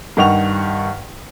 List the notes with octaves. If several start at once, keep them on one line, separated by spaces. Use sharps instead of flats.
G2 D#3 F#5 C#6 F7